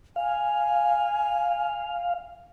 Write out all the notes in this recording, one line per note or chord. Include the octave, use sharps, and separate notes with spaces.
F5 G#5